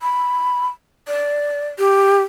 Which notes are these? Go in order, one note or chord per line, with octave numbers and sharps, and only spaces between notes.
B5
D5
G4